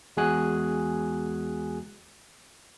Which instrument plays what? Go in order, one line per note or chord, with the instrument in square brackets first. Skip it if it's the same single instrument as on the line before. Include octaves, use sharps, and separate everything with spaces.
[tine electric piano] E2 G#3 F#4 G#4 G#5 F#6